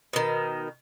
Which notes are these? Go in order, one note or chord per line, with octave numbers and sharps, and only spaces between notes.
B2 D#3